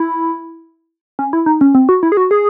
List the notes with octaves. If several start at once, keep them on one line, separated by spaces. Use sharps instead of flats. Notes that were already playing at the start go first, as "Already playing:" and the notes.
Already playing: E4
C#4
E4
D#4
C#4
C4
F#4
E4
G#4
F#4
G#4